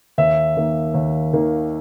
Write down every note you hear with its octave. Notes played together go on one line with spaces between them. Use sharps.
D#2 E5
D#3 A#3
D#2
D#3 A#3